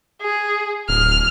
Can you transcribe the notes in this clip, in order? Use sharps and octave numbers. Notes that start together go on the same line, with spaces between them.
G#4
D1 F6